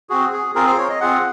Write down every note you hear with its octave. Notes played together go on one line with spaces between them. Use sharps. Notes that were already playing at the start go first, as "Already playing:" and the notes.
C4 F#4 G#4
G#4
C4 F4 G#4 A#4
C5
C#5
D#5
C4 F4 G#4 F#5